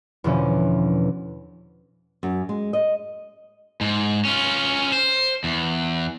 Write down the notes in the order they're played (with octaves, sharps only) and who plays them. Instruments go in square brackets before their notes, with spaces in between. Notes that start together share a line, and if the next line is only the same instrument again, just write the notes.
[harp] E2 B2 D3 F3 C#4
[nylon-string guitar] F#2
G#3
D#5
[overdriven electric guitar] G#2
C#4 F4
C5
E2